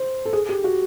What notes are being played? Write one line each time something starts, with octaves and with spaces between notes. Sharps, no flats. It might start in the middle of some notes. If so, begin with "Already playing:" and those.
Already playing: C5
A4
G#4
G4
F#4